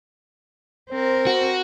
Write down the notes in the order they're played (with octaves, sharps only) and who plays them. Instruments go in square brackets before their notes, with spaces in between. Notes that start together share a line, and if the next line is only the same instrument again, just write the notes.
[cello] C4 A#4 [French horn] C5
[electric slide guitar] F#4